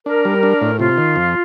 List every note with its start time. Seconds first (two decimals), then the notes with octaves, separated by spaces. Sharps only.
0.06 D4 A#4
0.25 G3
0.43 D4
0.62 A2
0.79 C3 F4
0.98 D#3
1.16 F2